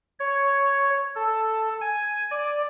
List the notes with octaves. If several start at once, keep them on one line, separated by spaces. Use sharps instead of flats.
C#5
A4
G#5
D5